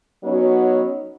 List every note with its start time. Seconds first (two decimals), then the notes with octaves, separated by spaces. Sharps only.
0.23 F#3 B3 C#4 D#4 F#4